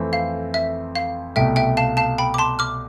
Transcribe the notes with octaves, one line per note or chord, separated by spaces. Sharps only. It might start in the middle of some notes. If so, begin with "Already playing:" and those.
Already playing: F2 E3 A3 C4
F5
E5
F5
C2 B2 A3 E5 G5
E5 G5
F5 A5
F5 A5
G5 B5
D6
A5 C6
D6 F6